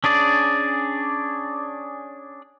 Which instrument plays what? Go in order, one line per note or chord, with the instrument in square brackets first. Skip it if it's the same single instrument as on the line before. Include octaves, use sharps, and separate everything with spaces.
[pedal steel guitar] C#4 D4 G#4 D5